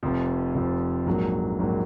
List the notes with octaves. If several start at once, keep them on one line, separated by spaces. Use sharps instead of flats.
F1 F2 F3
F1 F2 F3
A#1 G#2 F#3 A#3
A#1 G#2 F#3 A#3